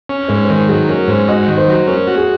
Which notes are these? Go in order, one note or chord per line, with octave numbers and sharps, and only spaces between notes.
C#4
G#2 C#5
C5
D#3 A#4
F#3 G#4
C#4 A#4
G#2 C5
F#4 D#5
D#3
C5
F#3
C#4 A#4
F#4
G#4